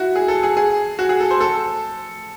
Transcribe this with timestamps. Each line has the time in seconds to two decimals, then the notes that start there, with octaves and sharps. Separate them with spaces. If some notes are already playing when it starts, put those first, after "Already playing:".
Already playing: E4 F#4
0.16 G#4
0.28 A4
0.43 G#4
0.57 G#4
0.99 F#4
1.09 G#4
1.20 A4
1.31 C5
1.41 A4